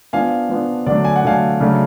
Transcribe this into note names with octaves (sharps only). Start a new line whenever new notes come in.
F3 B3 D4 F5 G#5
F3 B3 D4
D3 F#3 A3 D4 D5
G#5
F#5
D3 F#3 A3 D4 F5 G#5
C#3 F#3 A3 D4